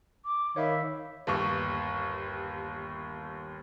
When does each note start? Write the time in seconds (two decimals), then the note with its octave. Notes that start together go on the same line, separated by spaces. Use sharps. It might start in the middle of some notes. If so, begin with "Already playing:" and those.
0.25 D6
0.56 D#3 C#5 E5 F5 B5
1.27 G1 D#2 C#6